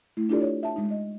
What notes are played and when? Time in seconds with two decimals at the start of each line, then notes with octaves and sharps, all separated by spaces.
0.17 A3 E4
0.29 D4 E4 F4 G4 A4 D5
0.41 C#5
0.63 E5 A5
0.76 G#3 D#4
0.91 D#5